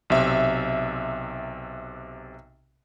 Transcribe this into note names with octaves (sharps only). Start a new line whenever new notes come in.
B1 C3 E5